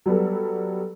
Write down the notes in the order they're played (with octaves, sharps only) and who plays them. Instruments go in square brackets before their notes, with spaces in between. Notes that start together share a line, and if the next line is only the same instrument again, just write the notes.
[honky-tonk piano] F#3 G3 B3 A4